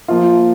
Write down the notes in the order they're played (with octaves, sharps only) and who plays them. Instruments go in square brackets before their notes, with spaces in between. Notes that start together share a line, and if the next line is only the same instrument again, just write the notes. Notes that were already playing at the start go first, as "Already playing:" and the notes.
[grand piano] F3 A#3 F4